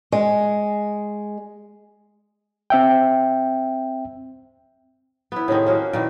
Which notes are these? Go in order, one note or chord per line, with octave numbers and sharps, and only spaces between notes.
G#3
C4 E5 G5
B3 E4
A2 C3 D#3 G#3
A#3 C#4 F#4 G#4
A#2 D#3 E3